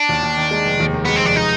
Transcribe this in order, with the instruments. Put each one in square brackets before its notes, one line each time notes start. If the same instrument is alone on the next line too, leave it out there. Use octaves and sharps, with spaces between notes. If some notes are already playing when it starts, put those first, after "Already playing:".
Already playing: [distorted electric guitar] D4
[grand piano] D#2
D#2
D#3
G#3
F1
D#2
D#3
[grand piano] G#3 [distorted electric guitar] B3
[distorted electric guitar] C4
[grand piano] F1 [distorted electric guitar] D4
[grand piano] G#3 [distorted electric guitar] D#4